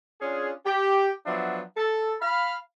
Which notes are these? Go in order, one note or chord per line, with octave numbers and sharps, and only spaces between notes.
C#4 D4 F4 G#4
G4
F3 F#3 B3 D4 E5
A4
F5 B5